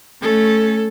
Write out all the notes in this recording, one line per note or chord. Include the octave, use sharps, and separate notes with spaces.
A3 C#4 A4